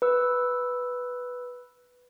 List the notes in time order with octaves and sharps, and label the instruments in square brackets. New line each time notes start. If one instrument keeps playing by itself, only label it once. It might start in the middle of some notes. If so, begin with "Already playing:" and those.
[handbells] B4 E6